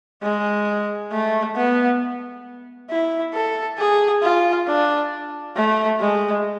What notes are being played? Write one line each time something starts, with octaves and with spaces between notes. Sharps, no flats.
G#3
A3
B3
E4
A4
G#4
F4
D4
A3
G#3